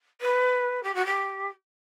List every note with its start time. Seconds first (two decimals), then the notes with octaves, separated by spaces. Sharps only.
0.21 B4
0.83 G4
0.94 F#4
1.05 G4